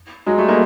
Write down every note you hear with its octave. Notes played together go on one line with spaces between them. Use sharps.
F#3 G#3
G3 A3
G#3 A#3